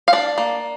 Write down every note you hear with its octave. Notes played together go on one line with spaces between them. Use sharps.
F5
D4 D5
A#3